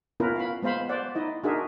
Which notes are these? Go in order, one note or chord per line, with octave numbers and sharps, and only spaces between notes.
B3 C#4 E4 F4 A#4 B4
F5 B5
G#3 B3 C5 F5 B5
C5 D5 F#5
D#4 E4 D#5
D4 D#4 F#4 G#4 A#4 E5